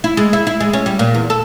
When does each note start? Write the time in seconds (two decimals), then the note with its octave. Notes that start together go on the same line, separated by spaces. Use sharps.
0.04 E4
0.17 G#3
0.33 E4
0.47 E4
0.60 G#3
0.73 C#4
0.86 G3
0.99 A#2
1.15 E2
1.30 A4